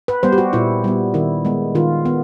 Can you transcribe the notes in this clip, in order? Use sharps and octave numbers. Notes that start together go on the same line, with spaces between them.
B4
G3 B3 C5
G4
F#4
A#2 E4
G3 B3
D#3 E4
G#3 B3
D#3 F4
B3